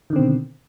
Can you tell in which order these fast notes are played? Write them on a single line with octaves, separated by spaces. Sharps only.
D#3 D3 C4 B2